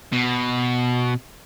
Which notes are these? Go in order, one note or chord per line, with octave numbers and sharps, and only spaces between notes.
B2